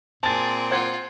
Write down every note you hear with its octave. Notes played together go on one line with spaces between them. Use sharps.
A#2 C4 G#4 A5 A6
F4 C5 F#5 G#6